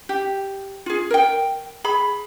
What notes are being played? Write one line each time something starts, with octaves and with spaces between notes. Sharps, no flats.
G4
F4 G#4
A#4 G5
G#4 B5